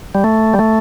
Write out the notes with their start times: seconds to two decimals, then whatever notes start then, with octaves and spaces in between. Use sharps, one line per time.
0.15 G3
0.24 A3
0.54 G3
0.59 A3